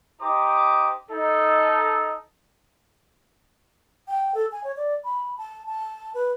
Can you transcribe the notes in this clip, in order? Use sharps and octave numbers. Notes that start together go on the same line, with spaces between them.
D#4 G4 C5 A#5 D6 D#6
D#4 A4
G5
A4
G#5
C#5
D5
B5
A5
A5
B4